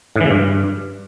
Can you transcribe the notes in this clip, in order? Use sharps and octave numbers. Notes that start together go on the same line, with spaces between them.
A2
E3
C#3
G2